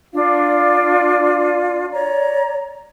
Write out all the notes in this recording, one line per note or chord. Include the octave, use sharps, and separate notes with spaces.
D4 F4 D5 F5
C#5 D5 A#5